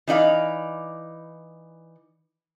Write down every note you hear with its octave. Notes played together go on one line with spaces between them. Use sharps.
E3 D#4 D5 F5